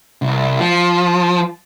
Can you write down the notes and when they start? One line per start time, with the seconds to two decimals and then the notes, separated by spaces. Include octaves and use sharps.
0.22 C2
0.60 F3